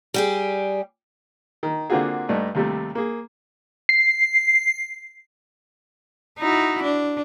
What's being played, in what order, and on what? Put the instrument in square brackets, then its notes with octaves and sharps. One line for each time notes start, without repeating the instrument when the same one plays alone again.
[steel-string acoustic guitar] G3 G4 G#4
[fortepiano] D#3
D3 A#3 C4 F4 F#4 G#4
G2 A3 D4 D#4
D#2 C3 G3 A3
A#3 G#4
[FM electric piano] C7
[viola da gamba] D#4 E4 F#4
D4